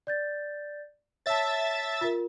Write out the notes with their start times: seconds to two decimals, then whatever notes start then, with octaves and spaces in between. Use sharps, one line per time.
0.07 D5 G6 A6
1.26 C#5 E5 A5 A6
2.01 F4 A#4